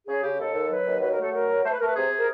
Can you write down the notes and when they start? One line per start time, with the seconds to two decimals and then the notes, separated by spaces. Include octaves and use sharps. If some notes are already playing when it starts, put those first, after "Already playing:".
0.06 C#3 G#4
0.22 C#3 G4
0.33 G#4
0.38 D#2 A4
0.54 D#2
0.70 F#3 B4
0.85 D#2
1.01 F#3 B4
1.12 A#4
1.17 A3
1.22 A4
1.32 F#3 A#4
1.48 F#3
1.64 A3 C5
1.72 B4
1.80 A3 A#4
1.88 B4
1.96 C3 G#4
2.11 C3
2.18 A#4